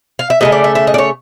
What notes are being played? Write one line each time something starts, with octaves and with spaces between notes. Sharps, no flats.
F5
E5
C#3 F#3 A3 D#5
D5
E5
E5
D#5
D5
C#5